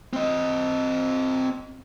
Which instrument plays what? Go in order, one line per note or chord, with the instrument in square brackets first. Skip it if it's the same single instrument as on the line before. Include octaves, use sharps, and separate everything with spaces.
[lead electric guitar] C4 D#5